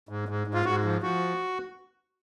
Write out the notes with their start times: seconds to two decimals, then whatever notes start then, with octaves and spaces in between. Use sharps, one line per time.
0.09 G#2
0.28 G#2
0.47 G#2
0.54 F4
0.65 G#2 F#4
0.85 F3
1.02 F3 F#4